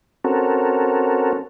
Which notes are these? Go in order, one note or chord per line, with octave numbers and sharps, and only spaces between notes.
C4 C#4 F#4 A4 A#4